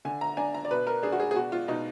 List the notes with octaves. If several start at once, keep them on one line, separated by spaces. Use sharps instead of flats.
D3 G#5
A#5
D4 G#5
A#5
D5
B2 B4
A#4
D4 G#4
F#4
G#4
G#4
B2 F#4
F4
B2 D#4